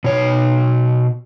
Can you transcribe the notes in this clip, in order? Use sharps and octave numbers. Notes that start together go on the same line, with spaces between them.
B2 C#5